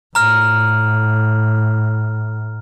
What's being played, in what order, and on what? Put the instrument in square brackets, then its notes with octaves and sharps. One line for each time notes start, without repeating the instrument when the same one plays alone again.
[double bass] A2 [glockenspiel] A#5 F6